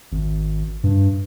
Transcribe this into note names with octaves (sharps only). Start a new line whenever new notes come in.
G#1
G2